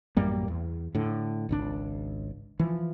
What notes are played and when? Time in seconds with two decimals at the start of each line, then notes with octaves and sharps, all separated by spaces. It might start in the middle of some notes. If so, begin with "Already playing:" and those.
0.17 A1 F#2 G3 A#3
0.48 E2
0.95 A2 D3
1.49 G#1 C#2 D4
2.59 E3 F3